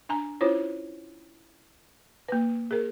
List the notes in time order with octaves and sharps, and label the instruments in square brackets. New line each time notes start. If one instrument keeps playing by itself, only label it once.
[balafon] D4 G#5 A#5
C#4 E4 F4 C5 C#5
A#3 B4
G#4 A#4